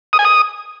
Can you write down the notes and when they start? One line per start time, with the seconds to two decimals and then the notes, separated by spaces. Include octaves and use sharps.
0.13 D#6
0.19 G#5
0.25 D#6